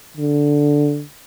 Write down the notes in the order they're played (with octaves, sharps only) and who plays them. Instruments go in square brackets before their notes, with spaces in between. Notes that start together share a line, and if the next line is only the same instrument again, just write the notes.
[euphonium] D3